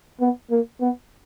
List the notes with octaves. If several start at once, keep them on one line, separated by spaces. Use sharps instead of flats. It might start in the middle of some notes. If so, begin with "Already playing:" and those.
B3
A#3
B3